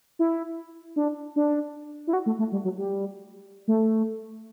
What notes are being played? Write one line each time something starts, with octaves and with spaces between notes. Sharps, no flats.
E4
D4
D4
E4
F#4
A3
A3
G3
F#3
G3
A3